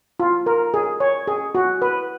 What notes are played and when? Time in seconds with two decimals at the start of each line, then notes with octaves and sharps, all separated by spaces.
0.20 F4
0.46 A#4
0.74 G#4
1.00 C#5
1.28 G#4
1.55 F#4
1.82 B4